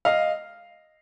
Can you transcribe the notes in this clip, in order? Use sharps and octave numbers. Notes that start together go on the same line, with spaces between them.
D#5 F5